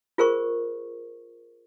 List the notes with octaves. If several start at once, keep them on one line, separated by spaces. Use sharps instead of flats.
F4 G#4 A#4 C5 C#6